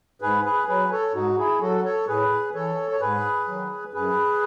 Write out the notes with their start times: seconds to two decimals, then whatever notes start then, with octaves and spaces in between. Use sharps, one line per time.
0.22 G#2 G#4 B4
0.44 G#4 B4
0.68 F#3 G#4 B4
0.91 A4 C#5
1.14 G#2 D#4 F#4
1.38 E4 G#4
1.61 F#3 F#4 A4
1.84 A4 C#5
2.08 A2 G#4 B4
2.54 E3 A4 C#5
2.91 C#5
3.00 G#2 G#4 B4
3.48 D#3 F#3
3.93 F#2 G#4 B4